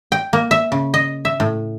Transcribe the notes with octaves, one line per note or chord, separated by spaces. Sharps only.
G5
A#3
E5
C#3
D#5
E5
A2